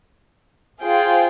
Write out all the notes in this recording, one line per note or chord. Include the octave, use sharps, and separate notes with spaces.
F4 G#4 C5 G5